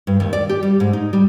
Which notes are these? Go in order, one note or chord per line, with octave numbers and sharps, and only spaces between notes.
G2
D#2
D5
G4
G3
G#2
D#4
G3